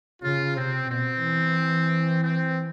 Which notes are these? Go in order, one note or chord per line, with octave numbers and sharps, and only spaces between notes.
C#3 F4
C3 C4
B2 C4
E3
C4